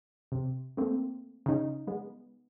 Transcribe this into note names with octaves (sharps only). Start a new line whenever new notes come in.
C3
A3 A#3 C4
C#3 D#4
G#3 B3